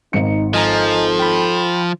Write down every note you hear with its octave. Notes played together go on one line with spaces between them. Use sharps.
G#1 D#4 C#7
F3 A4 D#5 G#5 A#5
G5 B5